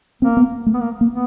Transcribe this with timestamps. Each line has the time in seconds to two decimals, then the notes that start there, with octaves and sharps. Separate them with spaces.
0.22 A#3 C4
0.37 B3
0.66 A3
0.74 B3
0.81 A#3
1.01 A#3
1.10 B3